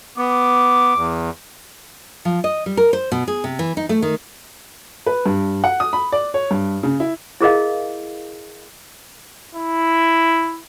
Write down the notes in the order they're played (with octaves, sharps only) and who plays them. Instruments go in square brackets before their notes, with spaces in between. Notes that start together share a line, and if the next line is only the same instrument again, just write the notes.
[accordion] B3 [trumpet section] D6
[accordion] E2
[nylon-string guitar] F3
D#5
G3
A#4
C5
B2
G#4
C3
E3
D#4
A3
D#3
[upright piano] B4
G2
F#5
D#6
B5
D5
C#5
G2
C#3
E4
[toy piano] E4 G#4 A#4 D#5 F5
[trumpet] E4